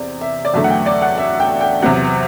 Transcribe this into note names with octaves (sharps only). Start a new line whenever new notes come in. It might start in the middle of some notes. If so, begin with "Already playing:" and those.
Already playing: E2 C3 D5
E5
D5
E2 D3 F#3 A3 E5
F#5
G5
D5
F#5
E5
G5
G5
E2 C3 F#3 F#5